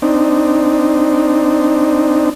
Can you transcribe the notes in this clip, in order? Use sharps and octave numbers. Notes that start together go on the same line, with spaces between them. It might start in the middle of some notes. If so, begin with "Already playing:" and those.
C4 D4 D#4